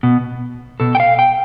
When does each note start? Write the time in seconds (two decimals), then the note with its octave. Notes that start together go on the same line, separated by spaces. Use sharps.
0.03 B2
0.80 B2 A4
0.95 G5
1.00 F5
1.19 G5